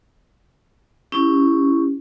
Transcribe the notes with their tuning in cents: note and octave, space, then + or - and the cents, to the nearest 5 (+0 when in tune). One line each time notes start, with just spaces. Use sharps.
C#4 +0 E4 +0 G4 +10